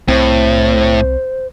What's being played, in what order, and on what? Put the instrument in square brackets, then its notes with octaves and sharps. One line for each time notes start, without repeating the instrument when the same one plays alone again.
[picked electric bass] C2 C4 [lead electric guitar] A2 [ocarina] C5